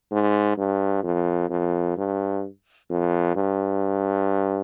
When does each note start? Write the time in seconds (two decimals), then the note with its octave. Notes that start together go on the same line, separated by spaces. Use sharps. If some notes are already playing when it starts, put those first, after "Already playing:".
0.11 G#2
0.57 G2
1.04 F2
1.50 F2
1.97 G2
2.90 F2
3.36 G2